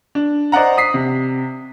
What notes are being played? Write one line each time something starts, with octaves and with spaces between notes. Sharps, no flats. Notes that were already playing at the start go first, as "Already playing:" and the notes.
D4
C5 D5 D#5 F#5 A#5
D#6 B6 C7
C3